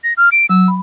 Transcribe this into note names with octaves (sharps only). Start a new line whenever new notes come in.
A#6
F6
D7
F#3 E6
B5